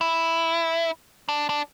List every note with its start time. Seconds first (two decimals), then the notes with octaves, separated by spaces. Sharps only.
0.01 E4
1.29 D4
1.49 D4